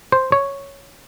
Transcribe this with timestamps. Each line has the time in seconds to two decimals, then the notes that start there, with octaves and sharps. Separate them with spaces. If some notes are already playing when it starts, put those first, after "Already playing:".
0.12 C5
0.32 C#5